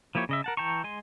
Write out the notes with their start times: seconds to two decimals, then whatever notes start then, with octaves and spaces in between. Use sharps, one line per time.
0.15 F3 A#3 E4 G4 C#5
0.29 C#3 D#5 E5
0.44 A#4 F#5 A5
0.57 E3 G5 A5 A#5 C#6
0.84 G#3 G#5 C6